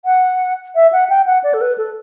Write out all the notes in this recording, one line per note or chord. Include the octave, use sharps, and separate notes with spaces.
F#5
E5
F#5
G5
F#5
D5
A4
B4
A4